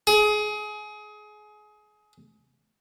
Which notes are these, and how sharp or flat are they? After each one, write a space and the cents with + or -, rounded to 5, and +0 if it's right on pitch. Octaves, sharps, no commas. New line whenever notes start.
G#4 +25